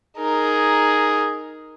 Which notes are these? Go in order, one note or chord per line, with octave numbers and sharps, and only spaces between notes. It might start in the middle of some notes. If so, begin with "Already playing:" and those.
D#4 G#4 A#4